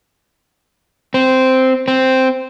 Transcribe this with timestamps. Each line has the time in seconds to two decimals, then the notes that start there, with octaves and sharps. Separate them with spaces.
1.14 C4
1.88 C4